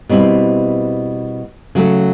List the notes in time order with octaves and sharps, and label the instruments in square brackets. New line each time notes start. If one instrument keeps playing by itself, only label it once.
[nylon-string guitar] B2 G3 C4 E4
C#3 F#3 A3